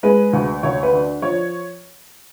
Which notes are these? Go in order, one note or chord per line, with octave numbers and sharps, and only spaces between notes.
G#3 B4
D2
D2 C#5
B4
D3
F3 C#5